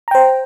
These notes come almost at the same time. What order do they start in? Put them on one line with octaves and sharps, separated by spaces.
A#5 G5 C5